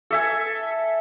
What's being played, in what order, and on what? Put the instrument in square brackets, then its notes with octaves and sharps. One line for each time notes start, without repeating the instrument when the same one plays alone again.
[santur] A4 E5 G#5